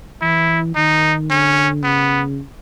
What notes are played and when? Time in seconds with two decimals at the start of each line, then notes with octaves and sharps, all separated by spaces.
0.22 E3 E4
0.76 D#3 D#4
1.30 D3 C#4
1.83 C#3 B3